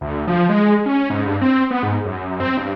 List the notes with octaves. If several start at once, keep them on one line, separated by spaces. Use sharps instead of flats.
D2
F3
G#3
C#4
G#2
G2
C4
B3
G#2
F#2
C4
G2